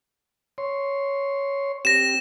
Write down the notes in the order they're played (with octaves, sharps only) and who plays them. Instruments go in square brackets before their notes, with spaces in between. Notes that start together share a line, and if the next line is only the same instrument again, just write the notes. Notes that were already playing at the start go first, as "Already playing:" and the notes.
[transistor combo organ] C#5 C6
[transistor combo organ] C4 G4 [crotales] A#6 E7